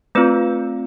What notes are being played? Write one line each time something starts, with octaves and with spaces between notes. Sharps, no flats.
A3 C4 F4 B4